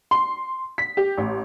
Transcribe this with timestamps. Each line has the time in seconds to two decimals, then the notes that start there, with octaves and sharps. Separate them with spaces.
0.11 C6
0.78 B6
0.97 G4
1.18 A1